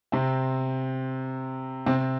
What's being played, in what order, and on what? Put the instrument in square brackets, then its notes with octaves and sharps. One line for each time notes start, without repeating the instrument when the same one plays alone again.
[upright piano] C3 C4
C3 C4